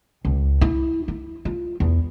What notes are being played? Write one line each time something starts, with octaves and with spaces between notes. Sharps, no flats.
C#2
E4
E4
F4
E2